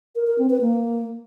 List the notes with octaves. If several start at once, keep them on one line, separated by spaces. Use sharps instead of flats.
A#4
A#4
C4
B4
A#3